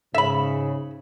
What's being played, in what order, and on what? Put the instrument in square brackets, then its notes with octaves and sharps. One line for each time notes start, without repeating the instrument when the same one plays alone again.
[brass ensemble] G#2 C#3 [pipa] E5 B5